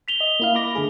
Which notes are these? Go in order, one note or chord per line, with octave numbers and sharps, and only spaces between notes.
B6 F7 G7
D#5
A#3 E4 F5
B5 D6 A#6
D3 A3 G#4